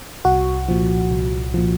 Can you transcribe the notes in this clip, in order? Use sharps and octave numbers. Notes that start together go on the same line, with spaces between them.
C2 F#4
A#2 F3
C2
A#2 F3